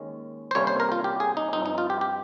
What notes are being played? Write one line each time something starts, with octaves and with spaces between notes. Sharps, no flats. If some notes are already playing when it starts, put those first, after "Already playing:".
Already playing: D#2 D#3 G#3 C#4
C5
C3 G3 A#3 C#4 C#5
C5
A#4
F4
G4
G#4
D#4
G2 F3 C4 D#4
D#4
F4
G4
G4